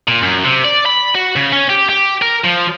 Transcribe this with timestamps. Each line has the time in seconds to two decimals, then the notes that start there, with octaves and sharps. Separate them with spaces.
0.08 A#2
0.23 F#2
0.44 C3
0.64 D5
0.86 B5
1.15 F#4
1.36 C#3
1.53 C#4
1.69 G4
1.89 G4
2.22 A#4
2.45 F3